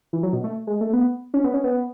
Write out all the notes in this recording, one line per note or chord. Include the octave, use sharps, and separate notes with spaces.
E3
F#3
B2
A3
G#3
A3
B3
C#4
B3
C#4
B3